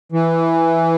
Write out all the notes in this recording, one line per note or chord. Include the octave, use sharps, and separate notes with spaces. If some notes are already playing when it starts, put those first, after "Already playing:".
E3